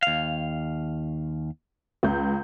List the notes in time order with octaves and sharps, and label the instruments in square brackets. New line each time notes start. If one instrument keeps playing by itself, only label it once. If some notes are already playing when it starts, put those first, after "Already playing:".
[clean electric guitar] D#2 F5
[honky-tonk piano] C#2 G6